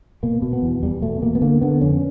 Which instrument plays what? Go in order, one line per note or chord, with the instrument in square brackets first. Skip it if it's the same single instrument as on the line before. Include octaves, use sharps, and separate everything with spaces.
[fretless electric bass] B2 A#3
B2
B3
E2
E2 G3
B2 A3
B2 A#3
B3
D3 A#3
D3 B3
F2 C#4